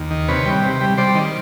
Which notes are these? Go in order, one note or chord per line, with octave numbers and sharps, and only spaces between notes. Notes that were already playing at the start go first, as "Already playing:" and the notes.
Already playing: D#2
D#3
C3 B4 C#5
G3
C3
G3
G3 C5 D5
D#3